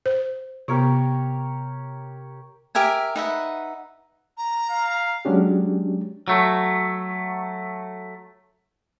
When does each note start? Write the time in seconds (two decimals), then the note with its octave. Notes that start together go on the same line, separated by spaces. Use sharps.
0.06 C5
0.68 C3 B3 G4 A#4 C#5
2.75 G4 A#4 E5 G#5
3.16 D#4 B4 E5 F#5
4.38 A#5
4.70 F5
5.25 F#3 G#3 C#4 D4 G4
6.28 F#3 A3